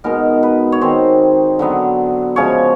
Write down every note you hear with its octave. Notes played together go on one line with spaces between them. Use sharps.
B2 G#3 B3 D#4 A#4
B4
C#5
D#3 G#3 C4 D#4 C5
D3 F#3 B3
C#3 F3 G#3 C#5